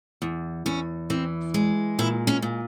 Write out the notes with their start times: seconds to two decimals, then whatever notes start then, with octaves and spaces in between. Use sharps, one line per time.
0.22 E2
0.66 E2 C#4
1.10 E3 C4
1.54 G#3
1.99 A#2 E4
2.27 C#4
2.42 A#2